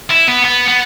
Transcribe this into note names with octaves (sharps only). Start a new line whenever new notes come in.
E4
B3
B3
B3